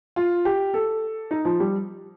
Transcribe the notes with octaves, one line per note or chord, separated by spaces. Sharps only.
F4
G4
A4
D#4
F3
G3